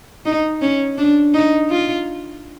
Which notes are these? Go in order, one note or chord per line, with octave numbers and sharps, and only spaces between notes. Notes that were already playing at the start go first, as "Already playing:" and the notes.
D#4
C#4
D4
D#4
F4